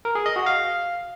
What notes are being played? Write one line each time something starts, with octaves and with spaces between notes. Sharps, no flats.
A#4
G#4
D#5
F#4
F5